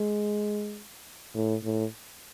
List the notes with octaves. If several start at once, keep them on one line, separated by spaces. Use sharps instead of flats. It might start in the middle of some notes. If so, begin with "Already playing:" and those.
Already playing: G#3
A2
A2